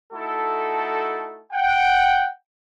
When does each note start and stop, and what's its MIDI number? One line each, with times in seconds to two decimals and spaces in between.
0.13 1.41 57
0.13 1.41 63
0.13 1.41 64
0.13 1.41 66
0.13 1.41 69
1.53 2.28 78
1.53 2.28 79